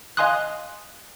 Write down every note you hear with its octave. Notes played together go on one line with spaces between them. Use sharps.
D#5 F5 G#5 C6 D#6 F#6